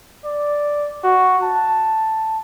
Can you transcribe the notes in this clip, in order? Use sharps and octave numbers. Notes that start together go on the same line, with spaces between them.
D5
F#4
A5